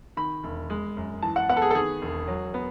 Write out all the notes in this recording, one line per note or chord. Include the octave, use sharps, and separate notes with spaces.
D#3 B5
E1
G#3
F#2
E3 A5
F#5
B3 F#5
A4
G#4
A4
D#3 G#4
E1
F#3
B3